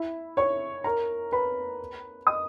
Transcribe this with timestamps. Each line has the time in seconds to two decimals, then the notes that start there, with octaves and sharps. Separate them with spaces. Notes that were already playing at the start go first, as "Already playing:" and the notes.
Already playing: E4 E5
0.37 C#5 C#6
0.84 A#4 A#5
1.32 B4 B5
2.27 D#5 D#6